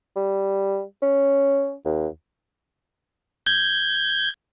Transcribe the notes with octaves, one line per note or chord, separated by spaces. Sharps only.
G3
C#4
D#2
G6 G#6